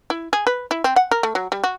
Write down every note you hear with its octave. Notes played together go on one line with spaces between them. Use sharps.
E4
G#4
B4
E4
C4
F#5
A#4
A3
F#3
G3
F#4